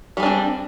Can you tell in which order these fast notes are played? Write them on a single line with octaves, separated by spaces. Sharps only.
G3 G#4 D4 C4